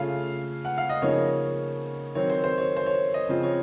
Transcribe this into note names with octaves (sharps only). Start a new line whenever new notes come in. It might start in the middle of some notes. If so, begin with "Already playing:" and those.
Already playing: C#3 A3 C#4 F4 F5
F#5
F5
D#5
C#3 F3 A#3 D#4 C#5
D#3 F#3 C4 C#5
C5
C5
C#5
C5
C#5
D#5
C#3 F3 C4 F4
C#5